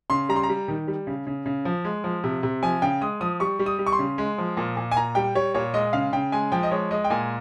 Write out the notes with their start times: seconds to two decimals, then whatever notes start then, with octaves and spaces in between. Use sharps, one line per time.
0.10 C#3 C6
0.29 G3 A#5
0.36 C6
0.43 A#5
0.49 G3
0.68 D#3
0.88 G3
1.07 C#3
1.27 C#3
1.46 C#3
1.65 F3
1.85 G#3
2.04 F3
2.24 C3
2.43 C3
2.63 F3 G#5
2.82 C#3 G5
3.01 G#3 D#6
3.21 F3 D#6
3.40 G3 C#6
3.59 G3
3.66 D#6
3.79 G3
3.87 C#6
3.92 C6
3.99 C#3
4.18 G#3
4.38 F3
4.57 A#2
4.77 A#2
4.91 G#5
4.96 A#2 A#5
5.15 G3 G5
5.35 G3 C#5
5.54 A#2 C#5
5.74 G#3 D#5
5.93 C#3 F5
6.13 C#3 G5
6.32 G#3 G#5
6.52 F3 G5
6.63 D#5
6.71 G#3 C#5
6.91 G#3 D#5
7.04 G5
7.10 A#2 G#5